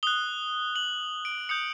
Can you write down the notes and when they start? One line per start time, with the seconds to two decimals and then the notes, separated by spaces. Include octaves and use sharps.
0.03 D#6 F#6 G7
0.76 F#7
1.25 D7
1.49 D#6 G6 C#7